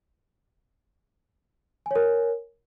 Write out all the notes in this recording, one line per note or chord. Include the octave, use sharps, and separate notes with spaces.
A#4 C#5 G#5